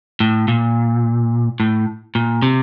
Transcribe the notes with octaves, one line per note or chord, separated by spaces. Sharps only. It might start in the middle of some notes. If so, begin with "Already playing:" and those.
A2
A#2
A2
A#2
C3